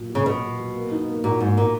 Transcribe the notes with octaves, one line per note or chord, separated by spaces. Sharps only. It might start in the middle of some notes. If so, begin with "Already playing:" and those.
Already playing: A#2 F#3
F#4
C#3
B2 F#3
A#2
F#3
A#3
D#4
A#3
A#2 F#4
G#2 A#3
A#2 A#3